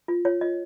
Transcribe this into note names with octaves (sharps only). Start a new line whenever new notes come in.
F4
F4 C#5
F4 D#5